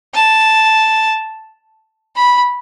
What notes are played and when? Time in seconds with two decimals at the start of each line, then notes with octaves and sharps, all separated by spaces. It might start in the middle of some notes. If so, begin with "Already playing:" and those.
0.14 A5
2.16 B5